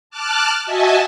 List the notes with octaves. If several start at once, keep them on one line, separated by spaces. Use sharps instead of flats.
A5 D6 F6 F#6
F#4 D#5 E5 G#5 A5